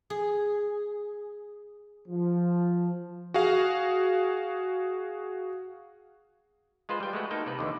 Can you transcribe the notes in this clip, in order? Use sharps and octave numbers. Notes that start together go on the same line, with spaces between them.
G#4
F3
F#4 G#4 F5
G#3 F4 B4 C5
G3 G5
G#3 A3 F#4 B4
A#3 D#4 A4 G5
C3 B4
D#2 D3 E3